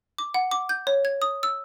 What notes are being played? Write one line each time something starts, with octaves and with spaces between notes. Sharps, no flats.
D6
F#5
D6
G6
C#5
G#6
D#6
E6